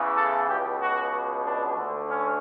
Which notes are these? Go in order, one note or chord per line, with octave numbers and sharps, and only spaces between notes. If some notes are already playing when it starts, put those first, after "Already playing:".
Already playing: E2 C#3 E3
A4
C#2 B2 G4
F#4
D4
D2 D3
C#4